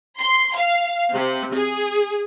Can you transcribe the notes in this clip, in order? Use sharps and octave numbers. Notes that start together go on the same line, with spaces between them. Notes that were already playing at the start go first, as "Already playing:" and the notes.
C6
F5
C3
G#4